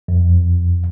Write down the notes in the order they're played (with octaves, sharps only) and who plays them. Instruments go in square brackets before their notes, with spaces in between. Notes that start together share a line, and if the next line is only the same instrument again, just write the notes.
[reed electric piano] F2